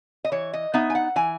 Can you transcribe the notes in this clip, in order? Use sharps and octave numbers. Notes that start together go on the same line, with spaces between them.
D#5
E3 C#5
D#5
B3 D#4 E5
G#5
F#5
E3 G#5